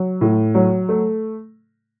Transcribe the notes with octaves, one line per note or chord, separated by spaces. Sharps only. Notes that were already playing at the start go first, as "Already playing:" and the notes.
Already playing: F#3
A2
F#3
A3